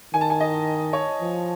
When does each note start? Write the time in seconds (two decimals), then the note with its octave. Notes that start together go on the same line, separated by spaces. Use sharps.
0.14 D#3 G#5
0.21 A5
0.30 G#5
0.40 D#5
0.93 C#5
1.21 F3